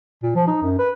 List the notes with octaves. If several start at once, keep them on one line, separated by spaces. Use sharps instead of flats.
A#2
F3
D#4
F#2
B4